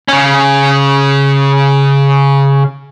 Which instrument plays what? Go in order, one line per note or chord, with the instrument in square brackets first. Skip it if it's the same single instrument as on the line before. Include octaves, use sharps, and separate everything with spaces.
[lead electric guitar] C#3 C#4